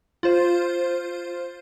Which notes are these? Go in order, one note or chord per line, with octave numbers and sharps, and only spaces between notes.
F4 C5